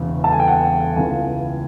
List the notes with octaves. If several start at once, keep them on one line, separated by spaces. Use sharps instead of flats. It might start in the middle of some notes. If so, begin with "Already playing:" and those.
Already playing: E1 E2 C#3
A5
G#5
G5
F#5
C#2 C#3 E3 G#5